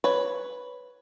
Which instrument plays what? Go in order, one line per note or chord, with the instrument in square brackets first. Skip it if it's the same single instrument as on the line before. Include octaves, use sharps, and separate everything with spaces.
[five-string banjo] B4 C#5